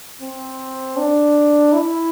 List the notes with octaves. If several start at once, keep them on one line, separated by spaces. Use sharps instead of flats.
C4
D4
E4